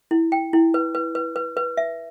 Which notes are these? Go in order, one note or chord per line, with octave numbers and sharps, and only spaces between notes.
E4
G5
E4
B4
B4
B4
B4
B4
E5